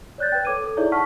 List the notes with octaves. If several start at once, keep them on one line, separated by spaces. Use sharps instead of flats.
C#5 D5 F#6 G6 A6
B4 G5
A4 C#5 D6 G#6 D#7
A4
D#4 E4 G#4 C#5 D5 E5
F#5 A5 C#6 F6 B6